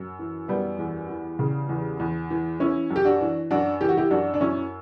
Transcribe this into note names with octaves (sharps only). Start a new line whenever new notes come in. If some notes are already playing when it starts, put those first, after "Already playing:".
Already playing: F#2
E3
F#2 G3 B3
E2
E3
C#3
E2
E2
E3
E3 C#4 E4
F#2
G4
D4 F#4
E3
F#2 D4 F#4
E3 G4
F#4
E4 G4
F#2 D4 F#4
D4
F#2 C#4 E4